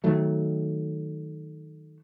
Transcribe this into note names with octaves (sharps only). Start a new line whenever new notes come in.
D#3 F#3 A3